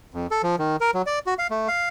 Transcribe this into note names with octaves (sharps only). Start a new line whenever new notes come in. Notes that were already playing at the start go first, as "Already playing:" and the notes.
F2
A4
F3
D#3
A#4
F#3
D5
F#4
F5
A3
F5